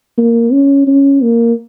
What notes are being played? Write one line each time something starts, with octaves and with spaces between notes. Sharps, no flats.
A#3
C#4
C#4
A#3